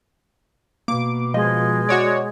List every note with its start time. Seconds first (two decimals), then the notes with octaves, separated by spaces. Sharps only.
0.88 B2 A#3 D6
1.34 F3 G#3 D#5
1.89 F#4 C#5 D5